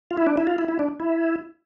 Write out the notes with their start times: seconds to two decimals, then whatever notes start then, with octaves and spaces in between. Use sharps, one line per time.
0.11 F4
0.17 E4
0.27 D4
0.37 E4
0.47 F4
0.58 E4
0.68 E4
0.79 D4
1.00 E4